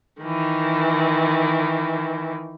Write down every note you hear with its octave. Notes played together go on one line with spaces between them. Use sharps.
D#3 E3